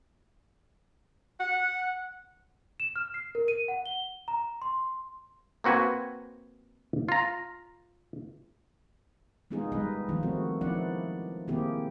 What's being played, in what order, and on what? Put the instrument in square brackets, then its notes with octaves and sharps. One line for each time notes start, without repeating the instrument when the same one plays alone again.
[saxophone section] F#5
[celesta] E7
F6
C7
A#4
D#7
F#5
G7
A#5
C6
[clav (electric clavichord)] A#3 C4 F#4 B4 G#5
F4 A#5
[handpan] G#3 B3 D#4 F4 G#4
G3 G#3 D#4 B4 D#5
D#3 F3 A3 B3 D#4 F4
A3 C4 F#4
F3 B3 D#4 E4 D5 F#5
D#3 A#3 C4 E4 G4 G#4